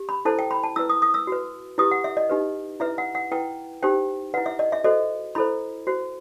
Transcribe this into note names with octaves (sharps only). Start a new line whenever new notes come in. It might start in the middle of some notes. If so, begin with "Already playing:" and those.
Already playing: G4
B5
E4 A4 C5 A5
G5
B5
A5
E4 B4 E6
D#6
D#6
E6
F#4 B4
E4 G4 B4 D#6
F#5
E5
D#5
D#4 G4 B4
E4 B4 E5
F#5
F#5
E4 B4 G5
D#4 G4 C5 G5
E4 B4 F#5
E5
D#5
E5
F#4 A4 C5 D#5
E4 A4 C5 B5
F#4 C5